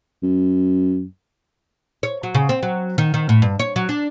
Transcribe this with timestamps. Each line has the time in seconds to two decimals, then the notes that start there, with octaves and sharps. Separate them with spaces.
0.23 F#2
2.03 C#5
2.23 F#3
2.35 C#3
2.49 C4
2.63 F#3
2.98 D#3
3.14 D#3
3.29 A2
3.42 G2
3.59 C#5
3.76 F#3
3.89 D4